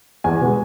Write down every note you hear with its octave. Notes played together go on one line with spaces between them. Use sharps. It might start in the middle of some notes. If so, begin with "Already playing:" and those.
E2 G#5
B2 G#3